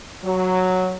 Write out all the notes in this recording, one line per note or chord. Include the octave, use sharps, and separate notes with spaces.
F#3